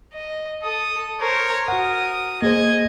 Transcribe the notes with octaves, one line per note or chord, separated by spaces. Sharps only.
D#5
A4 D#6
A#4 C5 C#5
F#4 A#4 F#5 D#6
A#3 G#4 C5 D#5 G#6